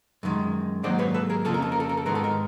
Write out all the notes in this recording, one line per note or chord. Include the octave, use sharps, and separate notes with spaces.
F#2 D#3 G#3
G#2 D#3 F#3 A#3 C5 D5
B4 C#5
A4 B4
G#4 A#4
F2 C#3 F3 A#3 A4
A#4
A4
A#4
A4
A#4
A4
G#2 D#3 G#3 B3 A#4
A4
A#4